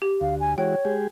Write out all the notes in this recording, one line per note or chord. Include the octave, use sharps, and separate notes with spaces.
G4
D2 F5
G#5
E3 G#3 F#4 C#5 G5
G#3 G4 G#4